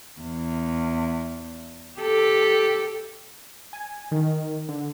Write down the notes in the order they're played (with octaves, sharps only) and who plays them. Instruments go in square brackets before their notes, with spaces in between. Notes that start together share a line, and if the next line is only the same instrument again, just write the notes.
[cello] E2
G4 A4
[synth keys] G#5
D#3
D3